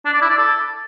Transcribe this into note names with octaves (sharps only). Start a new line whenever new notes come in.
D4
D5
E4
D5
A4